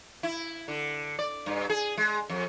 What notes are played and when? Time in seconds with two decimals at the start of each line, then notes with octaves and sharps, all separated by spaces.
0.23 E4
0.68 D3
1.19 D5
1.46 G2
1.70 G#4
1.97 G#3
2.30 F2